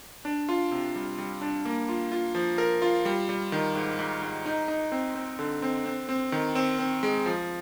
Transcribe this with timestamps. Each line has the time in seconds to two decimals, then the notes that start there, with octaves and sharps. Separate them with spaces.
0.25 D4
0.49 F4
0.71 C3
0.96 G3
1.18 G3
1.41 D4
1.65 A#3
1.89 F4
2.12 F4
2.35 F3
2.58 A#4
2.82 F4
3.05 G3
3.29 G3
3.52 D#3
3.75 G#2
3.99 G#2
4.22 G#2
4.46 D#4
4.68 D#4
4.92 C4
5.15 C4
5.39 D3
5.62 C4
5.85 C4
6.09 C4
6.32 D#3
6.55 C4
6.79 C4
7.03 G#3
7.26 F3